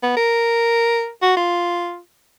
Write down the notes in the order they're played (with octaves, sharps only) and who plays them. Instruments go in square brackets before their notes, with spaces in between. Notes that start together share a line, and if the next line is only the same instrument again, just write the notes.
[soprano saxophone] B3
A#4
F#4
F4